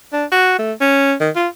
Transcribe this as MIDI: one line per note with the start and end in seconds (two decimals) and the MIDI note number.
0.13 0.25 62
0.32 0.57 66
0.59 0.72 57
0.81 1.14 61
1.20 1.30 51
1.35 1.48 65